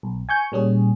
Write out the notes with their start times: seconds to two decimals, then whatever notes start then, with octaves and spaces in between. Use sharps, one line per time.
0.03 B1
0.29 G#5 C#6 G6
0.52 A#2 G3 C#4 G#4